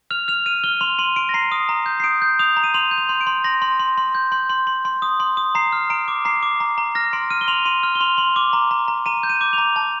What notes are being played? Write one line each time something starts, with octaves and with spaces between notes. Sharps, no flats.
F6 F7
F6 F7
F6 D#7
F6 G7
C6 F7
C6 D#7
C6 D7
A#6
A#5 C7
D#6
A#5
G6
C7
D#6 D7
G6
D#6 F7
A#5
D#7
C6 F7
G6
F7
C6
D7
C6
C6 A#6
C6
C6
C6
G6
C6
C6
C6
C6
D#6
C6
D#6
A#5 C7
F6
A#5 D7
D6
A#5 C7
D6
A#5
A#5
F6 A#6
C6 D7
F6 D#7
G7
C6 F7
C6 D#7
F6
G7
C6 F7
C6
D6
A#5
A#5
A#5
A#5 D#7
G6
D#7
D6
F7
A#5
A5